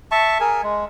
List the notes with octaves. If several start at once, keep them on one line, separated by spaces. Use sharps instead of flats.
E5 A5 C#6
G#4 A#4 G#5
G#3